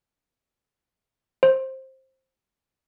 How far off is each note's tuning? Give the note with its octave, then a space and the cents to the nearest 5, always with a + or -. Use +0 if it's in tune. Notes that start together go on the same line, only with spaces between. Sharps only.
C5 +15